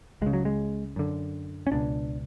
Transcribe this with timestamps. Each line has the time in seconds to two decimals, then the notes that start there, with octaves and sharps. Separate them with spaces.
0.22 C#2 C#3 G#3
0.33 F#3
0.45 G#3
0.96 F#2 D3
1.67 C#4
1.72 C#2 B2 D4